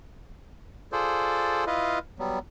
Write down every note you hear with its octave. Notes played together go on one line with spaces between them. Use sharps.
F4 G#4 A4 C5 D5
E4 F4 B4 D#5 F5
F#3 G3 B3